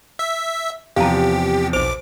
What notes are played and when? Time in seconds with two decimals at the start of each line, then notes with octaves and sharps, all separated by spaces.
0.19 E5
0.96 E2 C3 F3 G4 F5 A#5
1.73 B1 C5 D6 F7